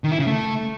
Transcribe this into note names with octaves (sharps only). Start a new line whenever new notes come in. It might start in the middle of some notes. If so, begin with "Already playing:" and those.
D#3
E4
C#3
A3